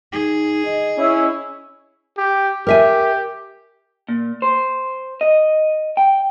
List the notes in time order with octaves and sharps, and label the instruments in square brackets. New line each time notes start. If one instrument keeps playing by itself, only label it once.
[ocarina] D#4 [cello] G#4
[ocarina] D#5
[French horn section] C#4 [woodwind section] E4
[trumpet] G4
[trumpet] G4 [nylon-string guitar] A#4 E5 G#5
[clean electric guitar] A#2
C5
D#5
G5